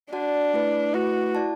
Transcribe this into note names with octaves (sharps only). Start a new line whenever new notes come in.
D4 F#4 D5 F#5 A5
A3 E4 B4
A3 E4 F#4 B4
E4 D5 A5